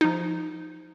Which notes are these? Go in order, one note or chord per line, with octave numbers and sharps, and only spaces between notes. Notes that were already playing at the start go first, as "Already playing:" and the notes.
F3 D#4